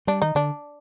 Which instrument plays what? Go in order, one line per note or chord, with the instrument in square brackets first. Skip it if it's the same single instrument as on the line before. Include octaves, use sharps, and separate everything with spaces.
[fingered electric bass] G3 [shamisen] D4
[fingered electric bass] D#3 [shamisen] D#4
[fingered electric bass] D3 [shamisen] D4